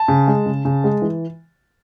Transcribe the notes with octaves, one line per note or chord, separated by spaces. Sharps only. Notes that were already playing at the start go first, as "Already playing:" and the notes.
Already playing: A5
C#3
G#3
C#3
C#3
G#3
E3